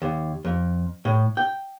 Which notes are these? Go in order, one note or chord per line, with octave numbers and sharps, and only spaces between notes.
D#2
F2
A2
G5